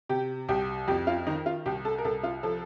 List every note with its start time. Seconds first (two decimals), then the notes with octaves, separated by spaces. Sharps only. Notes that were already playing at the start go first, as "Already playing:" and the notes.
0.09 C3 G4
0.49 C2 G4
0.88 F2 G4
1.07 F4
1.27 D#3 D#4
1.46 F4
1.66 C2 G4
1.85 A4
1.98 A#4
2.04 C2 A4
2.23 F4
2.43 F3 A4